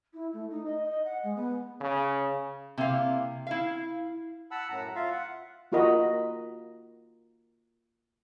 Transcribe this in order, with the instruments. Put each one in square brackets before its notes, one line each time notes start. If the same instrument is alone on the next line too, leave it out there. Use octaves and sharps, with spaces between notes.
[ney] E4
A3
D#4
D#5
D#5
F#5
G#3
B3
[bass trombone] C#3
[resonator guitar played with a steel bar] C3 A#3 E4 F5
E4 F5
[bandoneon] F#5 A5 B5 E6
F#2 A2 F#5 A#5
F4 E5 F5
F#5
[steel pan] A#3 F4 F#4 A#4 D#5 B5